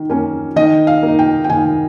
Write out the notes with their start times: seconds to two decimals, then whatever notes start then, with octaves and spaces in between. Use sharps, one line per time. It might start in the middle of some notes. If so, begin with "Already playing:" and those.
Already playing: D#3
0.10 A#3 C#4
0.56 D#3 D#5
0.87 F5
1.03 A#3
1.08 D#4
1.19 G5
1.44 G5
1.49 D#3 G#5